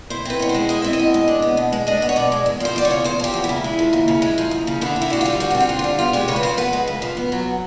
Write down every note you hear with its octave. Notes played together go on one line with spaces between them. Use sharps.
E4 C5
C4 B4
B2 C#5
C5
G#3
E4 D#5
C4 E5
D#5
B2
G#3
D4
B3
B2
G#3
D4 D#5
B3
C#5
B2 D5
G#3
E2
F3 C5
E2 D5
C#5
C#3
E2 C5
F3 G4
E2
E4
C#3
G#3
F3
D#2
C#3
G#3
F3
D#2
C#3
D3 E4
C4
E4
D3 F#4
G3 F4
D3 F#4
F#4
C4
F4
D3
G3 F4
B3 F4
G#3 G4
C#3 C#5
B4
F3 C5
B3 B4
G#3
C#3
F3
B3
F#3